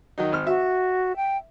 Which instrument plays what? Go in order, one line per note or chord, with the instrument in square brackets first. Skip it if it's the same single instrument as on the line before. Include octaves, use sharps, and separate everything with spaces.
[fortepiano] D#3 F#3 D#4
G#1 F6
[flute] F#4 [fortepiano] E5
[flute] G5